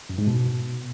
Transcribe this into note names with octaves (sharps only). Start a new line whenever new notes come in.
F#2
G#2
B2